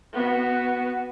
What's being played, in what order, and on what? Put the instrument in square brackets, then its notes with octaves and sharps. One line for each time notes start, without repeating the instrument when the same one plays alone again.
[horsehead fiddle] B3 F#4